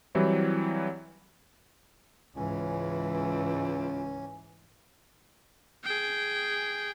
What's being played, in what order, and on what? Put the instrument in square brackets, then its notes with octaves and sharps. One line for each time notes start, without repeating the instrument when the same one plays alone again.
[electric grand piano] E3 F#3 G3 C4 E4
[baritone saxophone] C#2 [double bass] G#2 E3 [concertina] C#4
[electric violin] G#4 G5